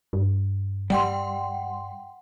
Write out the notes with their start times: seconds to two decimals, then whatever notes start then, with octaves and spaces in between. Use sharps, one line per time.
0.13 G2
0.90 G3 F#5 G5 C6